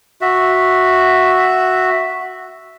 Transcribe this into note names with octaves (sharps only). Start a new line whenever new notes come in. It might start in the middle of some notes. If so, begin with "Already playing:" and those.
F#4 E5